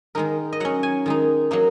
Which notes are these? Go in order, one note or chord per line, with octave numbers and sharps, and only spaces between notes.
D#3 G#3 D#4 A#4
D#5
F#3 C#4 F#5
G#5
D#3 G#3 D#4
F#3 A#3 D#4